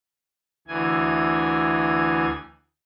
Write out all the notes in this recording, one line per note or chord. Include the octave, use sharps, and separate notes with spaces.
D2 E3 G#5